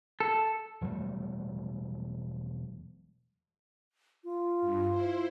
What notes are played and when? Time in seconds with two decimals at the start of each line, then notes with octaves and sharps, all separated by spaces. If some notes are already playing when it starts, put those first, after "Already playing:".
0.20 A4
0.81 E1 F#3 G3 A3
4.24 F4
4.61 G2
4.90 E4 C5